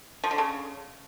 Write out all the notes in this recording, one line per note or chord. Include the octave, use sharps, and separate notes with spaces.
F3
D3
C#3